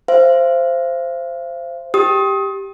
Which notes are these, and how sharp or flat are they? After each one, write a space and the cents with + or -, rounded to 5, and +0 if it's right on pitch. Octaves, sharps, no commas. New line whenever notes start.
C5 +0 F5 -40
G4 +0 D#6 +25